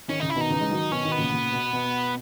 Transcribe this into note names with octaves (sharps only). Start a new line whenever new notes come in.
D#3 C#4
C#3 D#4
E4
B2 D#3 D#4
C#3 E3
G#3
D#3 F#3
B2 D#3 C#4
B2 D#3
B3
A#2 C#3
A#2 C#3
B2
B2